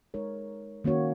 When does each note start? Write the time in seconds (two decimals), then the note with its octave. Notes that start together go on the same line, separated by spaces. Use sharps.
0.14 G#3 D#4 A#4 C#5
0.84 D#3 A#3 C#4 F#4 C#5